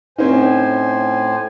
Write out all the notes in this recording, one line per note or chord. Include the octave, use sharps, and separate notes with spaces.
A2 C4 C#4 D#4 C5 G#5